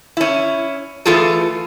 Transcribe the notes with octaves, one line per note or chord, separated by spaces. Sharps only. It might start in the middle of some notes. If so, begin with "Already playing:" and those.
C#4 E4
E3 A3 F4 G#4 A4